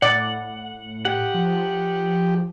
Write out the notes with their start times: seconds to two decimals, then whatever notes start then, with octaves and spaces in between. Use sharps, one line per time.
0.02 A2 D5 F#5
1.05 G4 F#5
1.34 F3